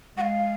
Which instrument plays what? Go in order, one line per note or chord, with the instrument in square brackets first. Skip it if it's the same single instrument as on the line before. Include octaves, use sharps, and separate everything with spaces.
[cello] G#3 [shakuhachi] F#5
[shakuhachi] F5